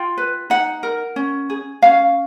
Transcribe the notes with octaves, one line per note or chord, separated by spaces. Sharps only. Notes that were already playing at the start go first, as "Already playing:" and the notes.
Already playing: F4 G5
B4
D#4 F#5
A#4
C#4
G#4
C#4 F5